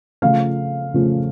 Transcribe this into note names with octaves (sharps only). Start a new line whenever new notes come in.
C#3 F3 A3 F5
C#3 F3 A3